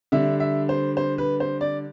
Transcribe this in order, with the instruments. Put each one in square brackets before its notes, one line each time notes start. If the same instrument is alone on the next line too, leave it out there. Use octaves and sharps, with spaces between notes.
[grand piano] D3 G3 D4 E5
E5
C5
C5
B4
C5
D5